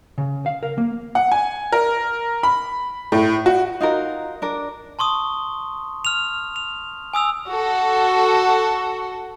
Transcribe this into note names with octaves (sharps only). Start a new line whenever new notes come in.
C#3
F5
A#4
A#3
F#5
G#5
A#4
B5
A2
F#4
D#4 F4 F#4 A#4
D4 A#4
A5 C6 C#6 D#6
F6 F7
F7
G#5 D#6 E6 F7
F#4 A4